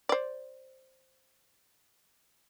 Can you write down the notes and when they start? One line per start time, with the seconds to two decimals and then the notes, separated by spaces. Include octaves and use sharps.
0.09 C5 D5